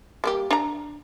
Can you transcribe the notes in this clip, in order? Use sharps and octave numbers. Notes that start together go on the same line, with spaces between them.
G3 A#3 G4
D4 A#5